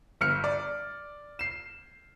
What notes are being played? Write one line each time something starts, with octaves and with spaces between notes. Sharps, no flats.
G1 F6 C#7
D5
C7 E7